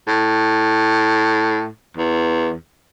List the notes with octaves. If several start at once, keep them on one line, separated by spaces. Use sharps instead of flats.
A2
E2